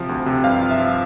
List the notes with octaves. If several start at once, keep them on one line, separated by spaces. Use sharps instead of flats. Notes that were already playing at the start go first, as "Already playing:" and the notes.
Already playing: C3 F3
D2
C3
G2 F5
F3
E5
F3